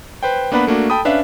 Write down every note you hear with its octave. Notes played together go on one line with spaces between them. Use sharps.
B4 C5 G5
A#3 B3 D4 B4 F#5 B5
A3 A#3 D4 F#4
A4 G5 A5 B5 D#6
C#4 D4 B4 E5 F5